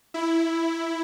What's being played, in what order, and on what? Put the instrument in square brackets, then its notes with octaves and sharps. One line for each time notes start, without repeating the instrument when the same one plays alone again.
[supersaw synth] E4